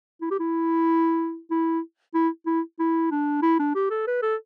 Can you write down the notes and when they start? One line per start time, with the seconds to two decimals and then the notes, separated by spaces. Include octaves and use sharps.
0.21 E4
0.31 G4
0.39 E4
1.51 E4
2.14 E4
2.46 E4
2.79 E4
3.11 D4
3.42 E4
3.59 D4
3.75 G4
3.90 A4
4.07 B4
4.22 A4